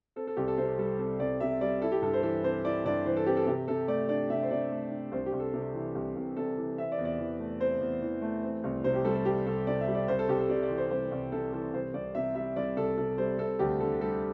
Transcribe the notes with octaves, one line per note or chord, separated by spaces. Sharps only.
C4 A4
A4
C2 G4
A4
C3 C5
G3 A4
C4 A4
C2 D5
C3 E5
G3 D5
E4 A4
G4
G2 A4
C5
E3 A4
C4 C5
E4 D5
G2 D5
E3 C5
A4
C4 G4
A4
C3 G4
C3 A4
A3 D5
D4 D5
C3 E5
C5
C3 D5
A3
D4
C2 C5
G4
C2
A4
C3
E3
C2
C2
C3 A4
E3
C4 E5
D5
E2
D5
E3
A3
C4 C5
E2
E3
A3
C4
C2
C3 C5
G4
G3 A4
A4
C4 G4
C2 A4
C3 D5
E5
G3
D5
C2 C5
A4
C2 G4
A4
C3 D5
D5
E3
C5
C2 C5
C2
C3 A4
E3 A4
C2 C5
C2 D5
C3 E5
G3 E5
C2 D5
C2 A4
C3 A4
G3 C5
C4 A4
D2 G4
D3 A4
G3 A4